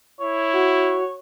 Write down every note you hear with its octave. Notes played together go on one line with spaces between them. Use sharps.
E4 C#5
F#4